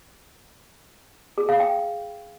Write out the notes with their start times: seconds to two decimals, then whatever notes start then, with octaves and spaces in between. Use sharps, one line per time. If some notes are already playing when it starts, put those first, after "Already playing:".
1.38 G#4
1.49 F5
1.60 G5